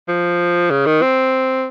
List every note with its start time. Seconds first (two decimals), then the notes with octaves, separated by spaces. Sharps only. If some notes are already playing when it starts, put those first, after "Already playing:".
0.08 F3
0.70 C#3
0.86 D#3
1.02 C4